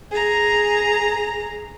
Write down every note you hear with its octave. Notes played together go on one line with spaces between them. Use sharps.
G#4 A#5